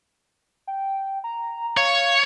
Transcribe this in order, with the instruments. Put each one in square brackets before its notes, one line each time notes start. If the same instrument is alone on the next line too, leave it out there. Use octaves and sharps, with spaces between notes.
[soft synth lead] G5
A#5
[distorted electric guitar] C#5 [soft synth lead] F5